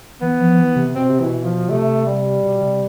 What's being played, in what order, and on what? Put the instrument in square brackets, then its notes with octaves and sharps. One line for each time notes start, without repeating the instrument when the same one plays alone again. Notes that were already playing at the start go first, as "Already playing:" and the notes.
[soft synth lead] E3 [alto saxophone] B3
[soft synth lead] F3
E3
C3
[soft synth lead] B2 [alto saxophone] C4
[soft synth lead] C3
[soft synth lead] B2 [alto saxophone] E3
[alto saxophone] F3
[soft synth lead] C3 [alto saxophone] A3
[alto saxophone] G3
[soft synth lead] B2
C3